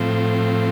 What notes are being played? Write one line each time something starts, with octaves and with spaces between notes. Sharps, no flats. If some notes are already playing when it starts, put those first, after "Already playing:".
Already playing: A2 F3 C4